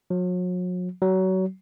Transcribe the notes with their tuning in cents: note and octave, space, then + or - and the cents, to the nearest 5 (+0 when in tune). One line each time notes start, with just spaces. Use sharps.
F#3 -40
F#3 +25